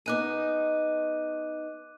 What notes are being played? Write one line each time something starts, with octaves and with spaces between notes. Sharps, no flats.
B3 D#4 G#4 D6 F#6 D#7